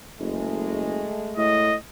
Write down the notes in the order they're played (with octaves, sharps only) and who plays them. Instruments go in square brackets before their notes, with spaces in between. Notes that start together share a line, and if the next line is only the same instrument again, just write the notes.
[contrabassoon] F#1 [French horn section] G#3 A3
[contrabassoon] A2 [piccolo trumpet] D#5